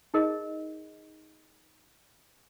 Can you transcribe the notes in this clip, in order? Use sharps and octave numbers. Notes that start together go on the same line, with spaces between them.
D#4 G#4 A#4 D#5